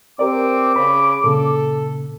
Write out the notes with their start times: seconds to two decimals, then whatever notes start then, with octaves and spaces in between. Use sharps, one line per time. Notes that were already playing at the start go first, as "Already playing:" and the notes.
0.19 C4 G4 A#4 D5 D6
0.76 C#3 B5
1.24 A#2 C#3 A4